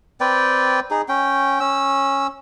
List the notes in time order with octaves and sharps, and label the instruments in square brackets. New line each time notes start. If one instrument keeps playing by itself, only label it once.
[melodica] C4 B4 D5 G5
D#4 G#4
C#4 G5
C#4 E6